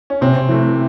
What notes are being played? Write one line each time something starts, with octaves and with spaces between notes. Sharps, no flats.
C#4
C3 C4
E3 A3